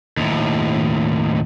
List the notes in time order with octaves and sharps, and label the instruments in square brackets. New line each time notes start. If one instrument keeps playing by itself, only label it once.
[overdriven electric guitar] D#2 A2